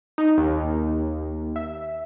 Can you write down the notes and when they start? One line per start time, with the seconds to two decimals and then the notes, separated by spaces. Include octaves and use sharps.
0.18 D#4
0.38 D#2
1.56 E5